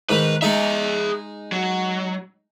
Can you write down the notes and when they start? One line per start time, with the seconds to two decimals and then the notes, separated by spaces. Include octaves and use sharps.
0.09 G#2 D#3 B4
0.42 G#3 D#4 G#4 E5
1.52 F#3